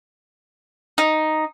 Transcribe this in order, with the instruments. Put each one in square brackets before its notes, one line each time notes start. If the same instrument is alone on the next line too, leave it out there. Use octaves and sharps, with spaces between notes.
[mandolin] D#4